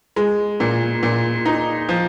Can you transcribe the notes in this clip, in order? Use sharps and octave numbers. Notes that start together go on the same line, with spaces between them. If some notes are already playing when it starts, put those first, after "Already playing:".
G#3
A#2
A#2
D#4
F3